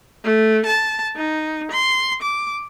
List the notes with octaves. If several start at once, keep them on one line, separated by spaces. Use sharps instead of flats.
A3
A5
D#4
C6
D6